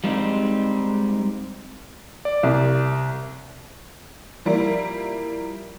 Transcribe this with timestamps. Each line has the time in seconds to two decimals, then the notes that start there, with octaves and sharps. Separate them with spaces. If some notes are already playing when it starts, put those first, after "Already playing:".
0.04 G3 G#3 C4 D#4
2.25 D5
2.43 C2
4.45 F3 G3 A#3 E4